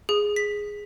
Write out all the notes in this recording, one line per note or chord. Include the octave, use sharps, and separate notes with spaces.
G#4
B6